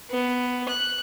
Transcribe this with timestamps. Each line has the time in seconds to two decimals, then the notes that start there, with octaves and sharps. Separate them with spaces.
0.11 B3
0.69 F#6